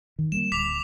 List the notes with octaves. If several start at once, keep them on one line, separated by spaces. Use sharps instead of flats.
D#3
G3 G#3 A#3 E7
D1 D6 B6 F7